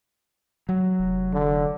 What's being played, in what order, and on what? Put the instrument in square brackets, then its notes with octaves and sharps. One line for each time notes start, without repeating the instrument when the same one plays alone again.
[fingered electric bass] F#3
[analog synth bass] F1
[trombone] D3